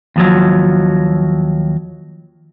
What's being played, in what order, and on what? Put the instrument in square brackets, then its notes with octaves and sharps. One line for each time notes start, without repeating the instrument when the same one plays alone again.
[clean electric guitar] D#2 F3 F#3